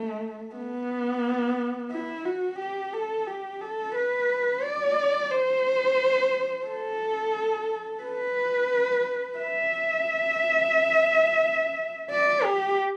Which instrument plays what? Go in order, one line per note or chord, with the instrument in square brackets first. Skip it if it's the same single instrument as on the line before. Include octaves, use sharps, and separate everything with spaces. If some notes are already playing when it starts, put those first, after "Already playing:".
Already playing: [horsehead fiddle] A3
B3
E4
F#4
G4
A4
G4
A4
B4
D5
C5
A4
B4
E5
D5
G4